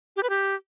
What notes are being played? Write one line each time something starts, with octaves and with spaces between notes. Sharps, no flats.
G4
B4
G4